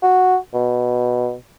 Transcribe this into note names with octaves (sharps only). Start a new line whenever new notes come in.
F#4
B2